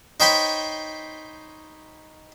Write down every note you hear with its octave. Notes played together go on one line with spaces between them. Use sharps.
D#4 C5 C#5 G5 B5 C6